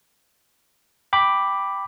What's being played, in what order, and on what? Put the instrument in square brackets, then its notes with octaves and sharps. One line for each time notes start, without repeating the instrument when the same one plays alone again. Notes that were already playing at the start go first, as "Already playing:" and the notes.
[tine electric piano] G5 B5 D6